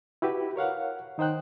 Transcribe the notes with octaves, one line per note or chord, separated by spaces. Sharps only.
E4 F#4 G4 B4
A#4 C#5 F5 F#5
D#3 D#4 C5 G5 F#6